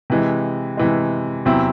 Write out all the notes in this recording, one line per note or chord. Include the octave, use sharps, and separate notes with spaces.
C3 E3 G#3
C3 E3 G#3
E2 C3 F#3 C4 E4